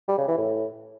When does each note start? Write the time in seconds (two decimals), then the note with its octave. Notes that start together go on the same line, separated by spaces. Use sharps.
0.08 G3
0.18 C#3
0.28 E3
0.38 A2